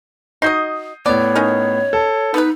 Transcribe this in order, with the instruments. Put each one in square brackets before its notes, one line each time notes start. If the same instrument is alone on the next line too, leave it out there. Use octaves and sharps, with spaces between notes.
[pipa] D#4 F#4 D#5 [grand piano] D#6 G6 C7
[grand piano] A2 B3 [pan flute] C#5 [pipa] D5
[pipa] C#4 D#4 A#4
[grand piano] A4
[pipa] B3 B4 [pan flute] D#4